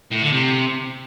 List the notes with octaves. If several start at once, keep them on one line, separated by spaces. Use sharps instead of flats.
A2
D3
C3